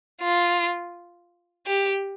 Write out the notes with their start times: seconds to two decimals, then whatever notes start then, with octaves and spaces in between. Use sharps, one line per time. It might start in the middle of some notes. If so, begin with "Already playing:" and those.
0.21 F4
1.66 G4